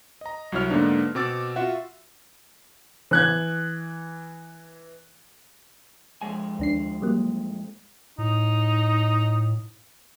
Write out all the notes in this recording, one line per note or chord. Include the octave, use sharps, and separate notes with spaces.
D#5 A#5
C2 F#3 E4 C#5 F6
G#2 D3 A#3 B3 D4 D#4
B2 C4 D6 E6 A6
F4 F#4 E5 F#5
E3 F#6 G#6
F2 G#3 G#5
D#2 D4 C7
F#3 G3 A#3
A2 D#4